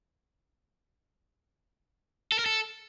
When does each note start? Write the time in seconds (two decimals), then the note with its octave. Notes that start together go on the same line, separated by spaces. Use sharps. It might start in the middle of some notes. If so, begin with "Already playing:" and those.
2.32 A4
2.39 A#4
2.46 A4